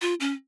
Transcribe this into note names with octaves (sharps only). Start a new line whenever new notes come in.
F4
C#4